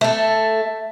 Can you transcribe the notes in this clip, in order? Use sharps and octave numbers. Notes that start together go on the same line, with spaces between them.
A3 A4